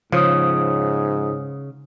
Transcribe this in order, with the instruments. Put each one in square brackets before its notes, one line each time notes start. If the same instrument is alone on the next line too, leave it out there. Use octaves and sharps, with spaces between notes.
[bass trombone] G#2 [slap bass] C#3 [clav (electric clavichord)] F3 [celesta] C#5 D#6